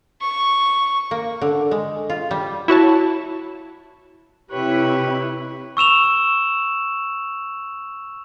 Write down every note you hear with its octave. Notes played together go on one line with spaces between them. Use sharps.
C#6
A#3
D3
G#3
F4
G3
E4 F#4 C#5 A5
C3 E4 G4 B4 C#5
C#6 E6 E7 F7